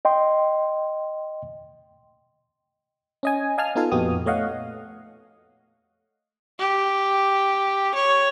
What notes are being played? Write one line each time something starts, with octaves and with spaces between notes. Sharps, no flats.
D#5 G5 C6
C#4 D#5 G#5
D#5 F5 G#5 A5 D#6 F6
B3 D#4 F4 A4 F5
F2 A#2 B3 F#4 G4 D#6
A3 C#5 D#5 F5 F#5
G4
C#5